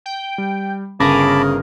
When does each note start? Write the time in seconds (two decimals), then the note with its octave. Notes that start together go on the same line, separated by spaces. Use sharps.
0.06 G5
0.38 G3
1.00 G1 C#3 G#4 A#4 A5 B5 D6 A#6